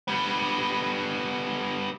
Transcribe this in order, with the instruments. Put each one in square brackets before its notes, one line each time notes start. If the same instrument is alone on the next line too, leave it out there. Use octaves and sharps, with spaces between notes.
[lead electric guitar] G3 B3